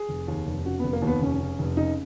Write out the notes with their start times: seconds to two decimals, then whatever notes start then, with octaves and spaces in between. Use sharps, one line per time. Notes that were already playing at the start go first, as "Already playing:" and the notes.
Already playing: G#4
0.09 F1
0.28 D#2
0.47 F1
0.65 C#3 F#4
0.80 F1 B3
0.93 A#3
1.02 D#2
1.07 B3
1.21 F1 C#4
1.40 C#3
1.59 F1
1.77 C#3 D#4